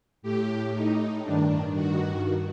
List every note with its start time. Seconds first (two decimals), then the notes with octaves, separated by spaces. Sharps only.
0.22 A2 G4
0.74 D#4
1.24 G2 D#3 D4
1.75 F#4